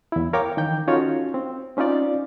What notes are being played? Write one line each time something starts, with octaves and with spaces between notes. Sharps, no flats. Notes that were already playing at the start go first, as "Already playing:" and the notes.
E2 E4
A#4 C#5 F5 G5 D6
D#3 E3 G5 G6
C#4 D#4 F4 F#4 A4 C#5
C4
C4 C#4 D#4 F4 D5